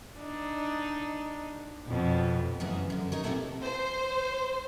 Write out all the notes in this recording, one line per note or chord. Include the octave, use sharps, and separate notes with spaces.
D4 D#4
F2 B2
F#2 C#3 E3 G#4
F#2 D3
D#4 A#4 C#5
C3 A#3 B3 E4 A4
C5